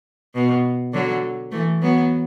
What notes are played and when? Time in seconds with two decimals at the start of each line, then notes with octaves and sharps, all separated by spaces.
0.35 B2
0.94 D3 F#3
1.52 E3 A3
1.82 F#3 B3